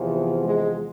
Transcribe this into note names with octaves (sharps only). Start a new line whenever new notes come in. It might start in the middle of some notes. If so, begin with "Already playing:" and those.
Already playing: E2 C3 F3
G#3